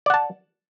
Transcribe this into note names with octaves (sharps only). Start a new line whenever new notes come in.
D5 F#5 A5